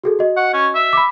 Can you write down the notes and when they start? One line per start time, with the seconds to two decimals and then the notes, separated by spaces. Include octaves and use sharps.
0.04 F#4 G#4 A4
0.19 F#4 D#5
0.37 F#5
0.54 C#4
0.75 E5
0.93 B5 D6